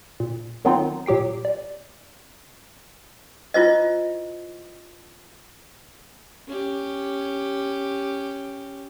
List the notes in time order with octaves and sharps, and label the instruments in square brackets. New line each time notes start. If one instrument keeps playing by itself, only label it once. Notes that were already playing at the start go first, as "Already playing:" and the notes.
[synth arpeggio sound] A#2
D#3 F#3 B3 C4 D#4 F4
A#2 F#3 G4 G5 C7
D5
[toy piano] E4 F4 C5 D#5
[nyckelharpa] C#4 G4